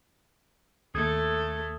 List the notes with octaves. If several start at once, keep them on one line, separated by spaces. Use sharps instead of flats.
D#2 A3 A4 D#6 G#6